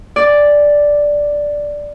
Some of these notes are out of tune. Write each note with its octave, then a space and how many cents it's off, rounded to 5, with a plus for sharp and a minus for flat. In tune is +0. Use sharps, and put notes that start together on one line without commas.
D5 +0 G#5 -15